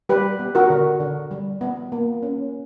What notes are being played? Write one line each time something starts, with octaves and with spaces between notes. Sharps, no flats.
G3 G4 B4
B3
F#4 A#4
D3
D3
G3
B3
A#3
C#4